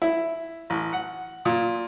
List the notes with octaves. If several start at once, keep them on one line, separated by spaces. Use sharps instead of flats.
E4
A1
F#5
A#2